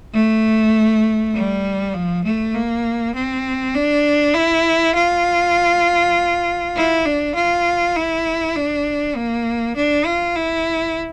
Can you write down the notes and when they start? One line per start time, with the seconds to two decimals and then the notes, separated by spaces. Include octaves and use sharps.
0.14 A3
1.34 G3
1.93 F3
2.24 A3
2.54 A#3
3.15 C4
3.74 D4
4.34 E4
4.95 F4
6.76 E4
7.06 D4
7.35 F4
7.96 E4
8.56 D4
9.17 A#3
9.77 D4
10.07 F4
10.36 E4